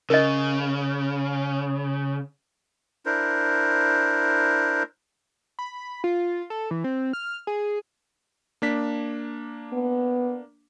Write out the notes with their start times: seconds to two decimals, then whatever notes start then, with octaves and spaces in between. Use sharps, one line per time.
0.10 C#3 A#4 D#5
3.06 D4 E4 A#4 C5
5.59 B5
6.04 F4
6.50 A4
6.71 E3
6.84 C4
7.13 F6
7.47 G#4
8.62 A#3 D4 B6
9.73 B3